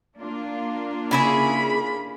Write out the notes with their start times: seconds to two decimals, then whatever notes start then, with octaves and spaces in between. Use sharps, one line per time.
0.18 A#3 D4 F4
1.11 C#3 E4 G#4 B5